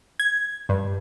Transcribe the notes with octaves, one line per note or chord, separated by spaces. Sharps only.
G#6
G2